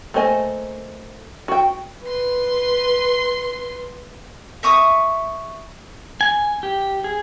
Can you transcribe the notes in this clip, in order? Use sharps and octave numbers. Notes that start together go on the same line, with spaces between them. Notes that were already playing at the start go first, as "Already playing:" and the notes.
A3 A#3 C5 D#5 G#5
F#4 G5
B4 C6
E5 C#6 D#6
G#5
G4
G#4